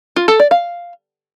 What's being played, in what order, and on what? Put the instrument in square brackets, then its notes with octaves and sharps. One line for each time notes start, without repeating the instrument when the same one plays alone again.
[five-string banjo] F4
A4
D5
F5